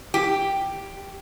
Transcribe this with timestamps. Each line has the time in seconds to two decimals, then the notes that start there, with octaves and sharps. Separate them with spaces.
0.14 G4